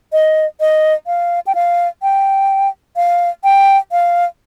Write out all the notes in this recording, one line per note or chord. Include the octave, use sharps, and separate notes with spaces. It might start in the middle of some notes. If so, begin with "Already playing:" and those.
D#5
D#5
F5
G5
F5
G5
F5
G5
F5